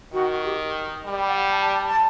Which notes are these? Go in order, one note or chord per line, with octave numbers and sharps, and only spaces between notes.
D#3 F#4
G4
G3
G5
F#5
A5
A5
A5